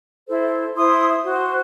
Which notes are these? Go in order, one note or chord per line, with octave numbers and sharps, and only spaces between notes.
E4 A4 C5
E4 C5 C6 D#6
F#4 C5